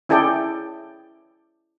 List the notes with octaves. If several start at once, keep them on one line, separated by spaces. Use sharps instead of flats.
C#4 E4 G#4 A4 D5 G5